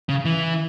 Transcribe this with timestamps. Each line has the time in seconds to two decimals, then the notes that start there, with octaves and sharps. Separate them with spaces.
0.09 C#3
0.25 E3